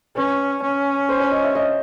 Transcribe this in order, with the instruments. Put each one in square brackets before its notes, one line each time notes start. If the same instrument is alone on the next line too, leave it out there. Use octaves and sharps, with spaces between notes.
[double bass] C#4 [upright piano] B4
[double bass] C#4
[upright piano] C5
C#5
D#5
E5
D#5